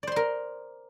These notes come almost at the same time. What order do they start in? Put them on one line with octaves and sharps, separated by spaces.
D5 C5 C6 A#4